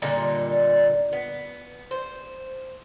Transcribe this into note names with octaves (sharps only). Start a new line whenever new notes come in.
A#2 D3 G3 D#4
B3
C5